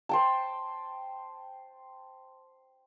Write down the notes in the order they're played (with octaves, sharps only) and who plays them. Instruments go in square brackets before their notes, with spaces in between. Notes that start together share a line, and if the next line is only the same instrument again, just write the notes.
[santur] C5 G5 A5